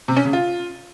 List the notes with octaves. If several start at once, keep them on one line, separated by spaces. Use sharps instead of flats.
C3
C#4
C#3
F4